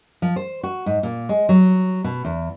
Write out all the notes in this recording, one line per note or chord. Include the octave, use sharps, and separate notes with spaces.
F3
C5
F#4
G#2
A#2
G#3
F#3
B2
E2